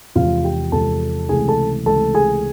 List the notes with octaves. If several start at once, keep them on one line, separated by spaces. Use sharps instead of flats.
E2 C3 F3 G#3 F4 F5
G4 G5
E2 C3 F3 G#3 A4 A5
C#2 C3 E3 A3 G#4 G#5
A4 A5
C#2 C3 E3 A3 A4 A5
G#4 G#5